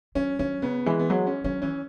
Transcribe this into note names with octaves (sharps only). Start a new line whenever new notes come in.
F#3 C#4
F#3 C#4
C#3 B3
E3 G#3
B3
F#3 G#3
C#4
F#3 C#4
E3 C#4